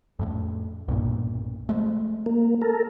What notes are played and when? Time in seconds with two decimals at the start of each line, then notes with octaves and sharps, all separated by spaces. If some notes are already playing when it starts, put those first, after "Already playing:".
0.19 F2 A2
0.88 B1 G2 A#2
1.69 F3 G#3 A3
2.26 A#3
2.61 A4 A#4